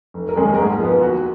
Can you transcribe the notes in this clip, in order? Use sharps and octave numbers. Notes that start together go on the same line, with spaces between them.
F1
A#4
D#2 D#3 G#3 C#4
G#4
G#2 A#4
G#4
F3 B3
D#2 F#4